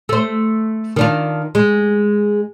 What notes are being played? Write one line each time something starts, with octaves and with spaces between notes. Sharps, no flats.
A3 C5
D#3 D4 F4
G#3